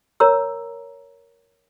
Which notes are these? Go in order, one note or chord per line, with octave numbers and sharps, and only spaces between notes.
A#4 C#5 A#5 E6